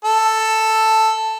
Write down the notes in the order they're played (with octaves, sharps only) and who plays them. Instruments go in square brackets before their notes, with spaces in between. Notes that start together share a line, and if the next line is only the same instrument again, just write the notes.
[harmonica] A4